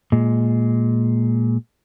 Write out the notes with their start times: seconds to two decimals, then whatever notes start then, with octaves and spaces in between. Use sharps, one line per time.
0.12 A#2 G#3